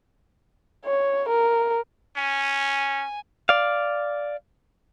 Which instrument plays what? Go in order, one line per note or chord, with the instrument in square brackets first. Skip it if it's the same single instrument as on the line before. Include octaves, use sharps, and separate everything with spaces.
[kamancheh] C#5
A#4
[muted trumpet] C#4 [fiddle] G#5
[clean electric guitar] D5 F5